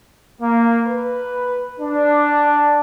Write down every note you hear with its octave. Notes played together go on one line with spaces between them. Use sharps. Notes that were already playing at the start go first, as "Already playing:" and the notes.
A#3
B4
D4